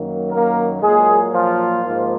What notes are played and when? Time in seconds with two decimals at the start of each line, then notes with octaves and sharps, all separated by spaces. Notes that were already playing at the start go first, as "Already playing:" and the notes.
Already playing: F#2 D#3 F#3 A#3
0.31 A#3 A#4
0.81 A#2 F#3 G#3 A#3 G#4
1.32 F3 F4
1.84 G#2 F3 A#3